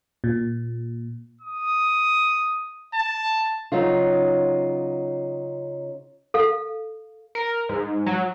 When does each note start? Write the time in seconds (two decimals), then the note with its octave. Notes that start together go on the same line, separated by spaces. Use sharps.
0.24 A#2
1.42 D#6
2.94 A5
3.72 C#3 F#3 D#4 F4
6.34 A4 F5
7.35 A#4
7.69 G#2
8.06 F#3